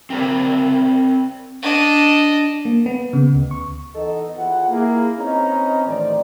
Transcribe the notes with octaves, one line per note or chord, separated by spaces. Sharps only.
C4 A#4 D5
D4 D#5
A#3
B3
C#3
D2
C#6
E3 B3 D#4 A4 D#5
E2 E3 F4 F#5
A#3 E4 G#4
C4 C#4 D#4 B4 D#5 A#5
A1 D#3 F3 C5 D5